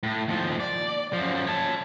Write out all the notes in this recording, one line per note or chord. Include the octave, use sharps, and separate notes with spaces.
A2
D#2 F3
D5
F#2 F3
C#5 A5